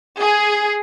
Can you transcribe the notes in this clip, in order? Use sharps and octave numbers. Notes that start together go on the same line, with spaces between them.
G#4